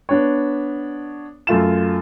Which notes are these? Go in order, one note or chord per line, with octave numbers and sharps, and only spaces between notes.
B3 D4 C#5
F#2 A3 F4 E7